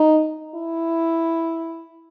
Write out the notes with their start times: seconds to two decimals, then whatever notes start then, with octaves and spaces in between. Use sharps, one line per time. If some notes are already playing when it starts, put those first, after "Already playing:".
Already playing: D#4
0.55 E4